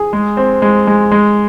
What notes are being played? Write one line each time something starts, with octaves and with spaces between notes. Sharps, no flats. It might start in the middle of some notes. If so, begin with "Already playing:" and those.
Already playing: G#4
G#3
C4
G#3
G#3
G#3